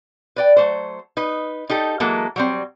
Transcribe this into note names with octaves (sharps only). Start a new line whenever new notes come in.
B4 D5 G5
F#3 A3 C5
D#4 B4
D#4 G4 A4
E3 F#3 G#3 A#3 A4
F#3 G3 C4